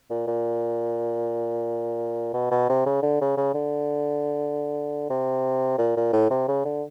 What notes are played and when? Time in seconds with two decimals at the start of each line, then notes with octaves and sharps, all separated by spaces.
0.10 A#2
0.27 A#2
2.34 B2
2.51 B2
2.69 C3
2.86 C#3
3.02 D3
3.21 C#3
3.37 C#3
3.54 D3
5.10 C3
5.78 A#2
5.96 A#2
6.13 A2
6.30 C3
6.48 C#3
6.65 D3